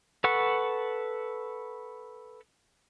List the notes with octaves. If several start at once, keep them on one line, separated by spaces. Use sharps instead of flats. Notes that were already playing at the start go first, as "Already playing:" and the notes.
A4 B4 F#5 C#6